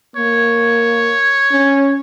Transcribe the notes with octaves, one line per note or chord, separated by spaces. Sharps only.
A#3 C#5
C#4